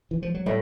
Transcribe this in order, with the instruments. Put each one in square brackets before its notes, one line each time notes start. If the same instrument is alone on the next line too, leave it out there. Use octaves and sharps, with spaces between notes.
[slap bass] E3
F3
F#3
[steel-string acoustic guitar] A2 [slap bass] G3